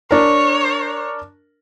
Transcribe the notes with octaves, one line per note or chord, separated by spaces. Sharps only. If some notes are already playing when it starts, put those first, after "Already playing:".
D4 A#4 C#5